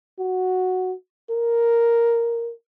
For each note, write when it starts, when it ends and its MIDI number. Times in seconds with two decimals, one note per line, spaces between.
0.19 0.93 66
1.30 2.51 70